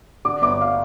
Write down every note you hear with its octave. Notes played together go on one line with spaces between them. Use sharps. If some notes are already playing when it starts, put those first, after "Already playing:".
D3 D6
G1 D6
F5